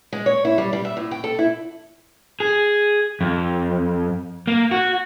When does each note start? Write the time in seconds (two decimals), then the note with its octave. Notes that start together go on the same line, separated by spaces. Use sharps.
0.13 G#3
0.26 C#5
0.45 E4
0.58 G3
0.73 G3
0.85 E5
0.97 A2
1.11 G5
1.24 A4
1.39 E4
2.40 G#4
3.21 F2
4.47 A#3
4.71 F#4